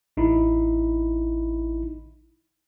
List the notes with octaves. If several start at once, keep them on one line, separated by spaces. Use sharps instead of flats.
A1 D#4 E4 B5